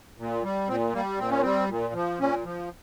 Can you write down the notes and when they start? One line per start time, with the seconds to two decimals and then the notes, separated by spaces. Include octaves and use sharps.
0.18 A#2
0.43 G3
0.68 A#2 C4
0.93 G3 A#3
1.19 A#2 C4
1.30 C#4
1.41 G3 C4
1.69 A#2
1.94 F3
2.19 A#2 C#4
2.44 F3